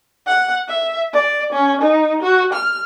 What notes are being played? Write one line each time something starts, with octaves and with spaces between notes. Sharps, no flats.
F#5
E5
D5
C#4
D#4
F#4
F6